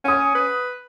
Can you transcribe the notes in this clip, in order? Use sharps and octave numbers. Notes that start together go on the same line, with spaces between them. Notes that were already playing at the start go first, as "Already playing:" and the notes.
C#4 F#5 D#6
B4